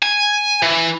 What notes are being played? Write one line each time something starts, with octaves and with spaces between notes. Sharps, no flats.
G#5
E3